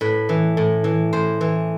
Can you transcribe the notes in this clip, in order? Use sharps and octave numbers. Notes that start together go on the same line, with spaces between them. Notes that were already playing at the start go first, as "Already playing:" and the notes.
A2 B4
E3
A2
E3
A2 C5
E3